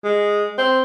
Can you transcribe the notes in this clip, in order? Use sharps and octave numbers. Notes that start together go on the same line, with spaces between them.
G#3
C4